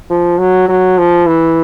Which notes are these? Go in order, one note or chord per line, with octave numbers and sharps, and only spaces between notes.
F3
F#3
F#3
F3
E3